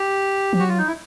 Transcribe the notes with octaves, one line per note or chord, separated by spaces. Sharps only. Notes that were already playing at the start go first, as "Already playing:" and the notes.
Already playing: G4
F3
F#3 F#4
F4
D#4
E4